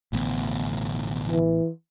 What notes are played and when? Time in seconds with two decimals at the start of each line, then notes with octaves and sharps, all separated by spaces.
0.13 A1 D2 B2 B3
1.27 E3